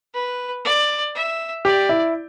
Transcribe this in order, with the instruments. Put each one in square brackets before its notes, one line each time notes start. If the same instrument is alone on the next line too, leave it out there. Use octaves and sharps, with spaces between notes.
[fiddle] B4
D5
E5
[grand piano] G4 [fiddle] D5
[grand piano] E4